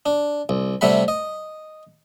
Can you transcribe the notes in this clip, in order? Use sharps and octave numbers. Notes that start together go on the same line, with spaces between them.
D4
C2
C3 G3 A3 F#5 B5
D#5